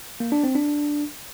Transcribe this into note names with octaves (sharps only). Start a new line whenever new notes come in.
A#3
D4
C4
D4